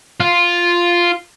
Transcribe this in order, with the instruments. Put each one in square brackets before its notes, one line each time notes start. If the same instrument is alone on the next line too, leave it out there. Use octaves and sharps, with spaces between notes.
[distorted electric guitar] F4